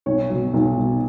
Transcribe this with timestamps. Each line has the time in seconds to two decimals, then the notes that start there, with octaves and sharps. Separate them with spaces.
0.06 B1 C#5
0.30 B2 F#3
0.54 B1
0.77 B2 F#3